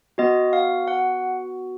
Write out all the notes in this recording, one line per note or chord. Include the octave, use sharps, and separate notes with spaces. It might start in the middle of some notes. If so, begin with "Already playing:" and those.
B3 F#4 D#5
F5
F#5